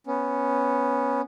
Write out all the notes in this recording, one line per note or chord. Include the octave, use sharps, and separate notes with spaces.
B3 C#4